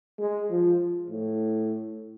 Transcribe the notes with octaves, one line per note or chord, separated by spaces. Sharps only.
G#3
F3
A2